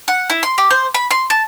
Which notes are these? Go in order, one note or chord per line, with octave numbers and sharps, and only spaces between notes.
F#5
E4
C6
G4
C5
B5
C6
A5